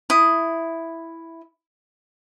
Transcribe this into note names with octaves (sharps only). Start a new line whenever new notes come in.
E4 D#6